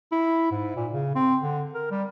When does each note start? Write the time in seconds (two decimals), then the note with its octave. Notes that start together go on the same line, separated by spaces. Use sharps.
0.12 E4
0.51 G#2
0.76 A#2
0.92 C#3
1.15 C4
1.41 D3
1.74 A#4
1.91 G3